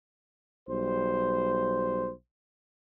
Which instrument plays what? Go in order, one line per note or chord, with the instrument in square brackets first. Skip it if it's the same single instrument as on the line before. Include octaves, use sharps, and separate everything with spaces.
[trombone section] B1 G3 C5